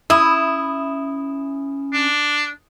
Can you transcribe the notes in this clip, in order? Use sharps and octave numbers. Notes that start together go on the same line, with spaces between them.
C#4 E4 D#6
D4